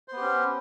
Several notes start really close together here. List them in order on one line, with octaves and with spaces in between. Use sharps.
C5 B3 G4 C#4